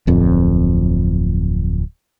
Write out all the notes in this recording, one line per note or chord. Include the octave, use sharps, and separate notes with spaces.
D1 F2